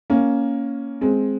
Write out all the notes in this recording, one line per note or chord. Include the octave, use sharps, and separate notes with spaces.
A#3 C#4
G#3 C4